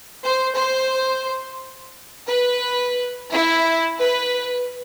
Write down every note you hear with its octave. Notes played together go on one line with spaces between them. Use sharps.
C5
C5
B4
E4
B4